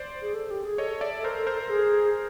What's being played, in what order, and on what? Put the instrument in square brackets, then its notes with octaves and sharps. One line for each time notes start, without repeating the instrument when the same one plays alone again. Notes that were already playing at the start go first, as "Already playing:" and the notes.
Already playing: [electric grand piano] C5 D5
[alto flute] G#4
A4
G4
G#4
[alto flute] A4 [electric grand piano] C#5 D#5
[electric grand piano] D5 E5
A#4 C5
A#4 C5
[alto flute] G#4